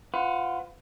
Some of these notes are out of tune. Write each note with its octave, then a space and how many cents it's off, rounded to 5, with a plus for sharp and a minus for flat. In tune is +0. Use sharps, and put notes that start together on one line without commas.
F4 +0 B4 +40 F#5 -5